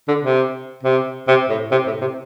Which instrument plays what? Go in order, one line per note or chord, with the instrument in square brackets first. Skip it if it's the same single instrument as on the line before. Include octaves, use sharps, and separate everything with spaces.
[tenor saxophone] D3
C3
C3
C3
A2
C3
A2
C3